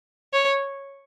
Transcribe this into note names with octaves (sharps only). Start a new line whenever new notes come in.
C#5